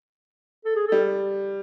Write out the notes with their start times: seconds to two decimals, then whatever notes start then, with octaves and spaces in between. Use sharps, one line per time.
0.65 A4
0.75 G#4
0.87 G3 A4